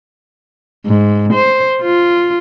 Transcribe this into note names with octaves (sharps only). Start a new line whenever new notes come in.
G#2
C5
F4